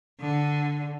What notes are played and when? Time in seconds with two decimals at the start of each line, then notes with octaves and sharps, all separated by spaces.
0.20 D3